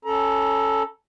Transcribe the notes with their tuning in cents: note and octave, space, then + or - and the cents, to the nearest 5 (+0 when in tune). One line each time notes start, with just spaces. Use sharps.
C#4 +0 A4 +0 A#5 +30